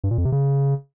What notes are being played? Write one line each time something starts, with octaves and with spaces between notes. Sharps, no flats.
G2
A#2
F2
C3
C#3